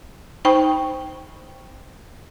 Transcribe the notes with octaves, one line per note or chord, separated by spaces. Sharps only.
D#4 C5 G5 B5 C#6